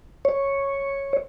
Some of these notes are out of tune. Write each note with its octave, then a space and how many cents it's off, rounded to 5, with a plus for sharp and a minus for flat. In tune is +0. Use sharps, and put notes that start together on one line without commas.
C#5 -5